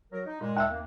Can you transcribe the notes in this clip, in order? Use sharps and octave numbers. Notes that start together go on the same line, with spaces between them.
F#3 A#4
D#4
G2 A#2 G#3
D#2 E5 E6
A#3 C4